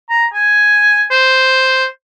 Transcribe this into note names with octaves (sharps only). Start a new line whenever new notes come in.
A#5
G#5
C5